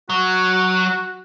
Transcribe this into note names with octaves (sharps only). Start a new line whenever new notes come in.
F#3 F#4